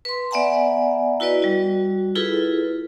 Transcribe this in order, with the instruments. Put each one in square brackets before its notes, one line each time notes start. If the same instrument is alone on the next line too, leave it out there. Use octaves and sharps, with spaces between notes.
[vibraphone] B4 C6
B3 D5 E5 F#5 G#5 A#5
E4 F#4 B4 D5 D#5
G3 F#4
E4 F4 G#4 A4 B4